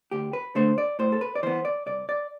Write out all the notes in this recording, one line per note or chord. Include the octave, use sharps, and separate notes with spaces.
D2 G4
B4
D3 A3 C5
D5
A2 C5
A4
B4
D5
E3 B3 C5
D5
C2 D5
D5